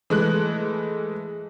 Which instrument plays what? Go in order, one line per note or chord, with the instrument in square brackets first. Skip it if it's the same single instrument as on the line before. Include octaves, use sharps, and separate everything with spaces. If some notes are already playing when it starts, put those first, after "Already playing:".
[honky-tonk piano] E3 G#3 A3 F#6